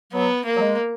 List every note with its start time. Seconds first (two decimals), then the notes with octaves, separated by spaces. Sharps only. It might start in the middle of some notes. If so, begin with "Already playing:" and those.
0.13 F#3 B3
0.45 A#3
0.56 F#3
0.61 G#3